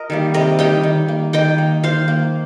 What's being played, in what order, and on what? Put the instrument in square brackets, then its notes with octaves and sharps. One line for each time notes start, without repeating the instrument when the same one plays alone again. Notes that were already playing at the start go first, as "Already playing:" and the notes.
Already playing: [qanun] A#4 D#5
D#3 G3 A#3
C3 A#4 D#5
D#3 G3 A#3 D#5 G5
D#3
A#3
D#3 D#5 G5
A#3
D#3 C5 F5
A#3